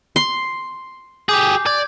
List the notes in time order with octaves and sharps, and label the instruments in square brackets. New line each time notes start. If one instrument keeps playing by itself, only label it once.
[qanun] C6
[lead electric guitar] G4 G#4 [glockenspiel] D6 G6
[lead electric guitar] D5 [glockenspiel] G#6